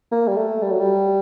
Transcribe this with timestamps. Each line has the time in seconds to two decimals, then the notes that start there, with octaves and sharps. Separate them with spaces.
0.12 A#3
0.28 G3
0.37 A3
0.63 G3
0.71 F#3
0.80 G3